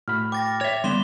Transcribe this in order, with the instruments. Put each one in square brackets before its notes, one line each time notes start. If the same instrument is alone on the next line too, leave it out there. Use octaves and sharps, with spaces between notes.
[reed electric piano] A2 F#4 B5 [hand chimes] F6
[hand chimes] G5 [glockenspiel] D6 A6 A#6
[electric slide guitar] C#5 E5 [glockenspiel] F7
[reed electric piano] D3 [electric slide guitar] G3 B3 [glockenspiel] C6 E7 G7